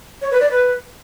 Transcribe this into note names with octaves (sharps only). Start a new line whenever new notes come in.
C#5
B4
D5
B4